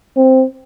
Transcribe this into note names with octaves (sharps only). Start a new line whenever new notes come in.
C4